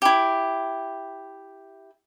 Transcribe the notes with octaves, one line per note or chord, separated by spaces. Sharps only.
E4 G4